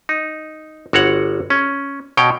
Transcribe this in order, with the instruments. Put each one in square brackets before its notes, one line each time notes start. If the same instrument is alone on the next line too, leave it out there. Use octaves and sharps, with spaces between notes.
[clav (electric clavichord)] D#4
G1 F#4 C#5 F#5
C#4
B2 C#5 G5